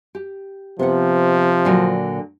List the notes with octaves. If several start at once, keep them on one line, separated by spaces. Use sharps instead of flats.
G4
C3 F3 B3 F#5
A#2 D3 F#3